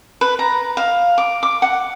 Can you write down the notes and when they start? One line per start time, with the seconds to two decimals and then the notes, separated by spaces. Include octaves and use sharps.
0.21 B4
0.39 A#5
0.77 F5
1.18 D6
1.43 D6
1.62 F#5